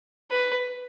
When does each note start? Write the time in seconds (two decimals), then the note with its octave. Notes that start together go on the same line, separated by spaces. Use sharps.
0.31 B4